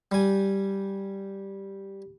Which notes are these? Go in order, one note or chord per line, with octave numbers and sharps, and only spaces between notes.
G3 G#5